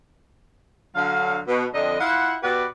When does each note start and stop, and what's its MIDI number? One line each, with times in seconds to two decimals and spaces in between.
0.96 1.39 50
0.96 1.39 54
0.96 1.39 77
1.48 1.64 47
1.74 1.97 41
1.74 1.97 50
1.74 1.97 75
2.00 2.35 64
2.00 2.35 65
2.00 2.35 77
2.00 2.35 78
2.43 2.65 47
2.43 2.65 66
2.43 2.65 67
2.43 2.65 71
2.43 2.65 74
2.43 2.65 78